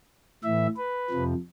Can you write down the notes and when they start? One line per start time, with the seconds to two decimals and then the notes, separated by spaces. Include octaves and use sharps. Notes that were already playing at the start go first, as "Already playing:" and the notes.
0.43 A2 E3 E5
0.77 B4
1.10 F2 C3 F3